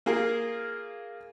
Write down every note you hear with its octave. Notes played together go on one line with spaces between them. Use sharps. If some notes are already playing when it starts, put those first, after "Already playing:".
A#3 F4 G#4 A#4